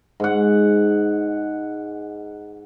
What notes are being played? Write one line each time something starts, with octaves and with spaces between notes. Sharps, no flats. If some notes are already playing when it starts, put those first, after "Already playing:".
G#2 F#5